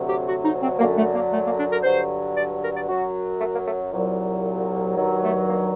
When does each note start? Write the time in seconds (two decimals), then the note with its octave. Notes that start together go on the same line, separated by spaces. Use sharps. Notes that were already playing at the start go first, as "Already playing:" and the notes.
Already playing: D2 C3 F#3
0.09 G4
0.27 F#4
0.44 D#4
0.62 C4
0.79 F#2 D3 F#3 A#3
0.96 A3
1.14 A#3
1.32 A3
1.45 A#3
1.57 D4
1.70 A#4
1.83 G2 D3 F#3 C5
2.36 D5
2.62 A#4
2.75 D5
2.88 F#2 F#3 F#4
3.40 A3
3.53 A#3
3.66 A3
3.93 C2 A#2 F#3
4.97 G2 D#3 F#3
5.23 A3
5.49 A#3